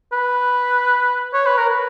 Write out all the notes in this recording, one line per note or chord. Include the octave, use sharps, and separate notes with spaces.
B4
C#5
B4
A#4
B4